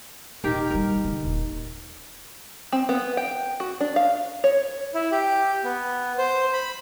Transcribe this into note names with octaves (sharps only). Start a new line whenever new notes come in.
D#1 D#3 G4 A#4
F#2 G3 A#4
D3 D4
D#1
C4
B3
G5
F#4
D4
F5
C#5
E4
G4
B3
C5
B5